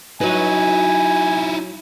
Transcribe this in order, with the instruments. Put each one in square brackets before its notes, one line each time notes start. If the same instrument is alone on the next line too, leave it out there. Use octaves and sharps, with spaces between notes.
[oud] F#3 B4 [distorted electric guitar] D#4 E4 [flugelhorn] G#5